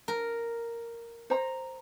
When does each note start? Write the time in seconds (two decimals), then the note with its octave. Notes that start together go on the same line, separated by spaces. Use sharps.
0.08 A#4
1.30 C5 A#5